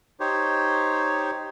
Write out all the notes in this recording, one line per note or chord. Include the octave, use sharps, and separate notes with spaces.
D#4 G4 C5 C#5